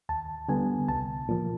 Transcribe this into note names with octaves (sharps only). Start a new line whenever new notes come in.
D#2 A5
D3 G3 B3 G#5
C2 A5
A#2 F3